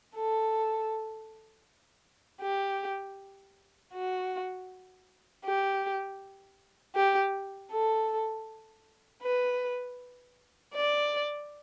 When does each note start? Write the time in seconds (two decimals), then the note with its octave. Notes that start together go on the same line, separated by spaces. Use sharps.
0.15 A4
2.41 G4
3.94 F#4
5.45 G4
6.95 G4
7.71 A4
9.23 B4
10.75 D5